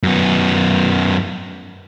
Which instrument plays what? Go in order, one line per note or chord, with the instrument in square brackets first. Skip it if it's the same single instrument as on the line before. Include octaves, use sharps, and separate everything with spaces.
[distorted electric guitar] F#2 B3